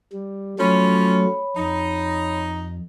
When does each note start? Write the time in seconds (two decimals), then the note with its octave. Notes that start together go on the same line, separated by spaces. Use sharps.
0.13 G3
0.59 F3 F#3 A3 C#4 C#5 B5
1.57 F2 D#4